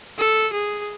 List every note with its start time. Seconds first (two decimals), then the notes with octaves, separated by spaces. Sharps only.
0.19 A4
0.53 G#4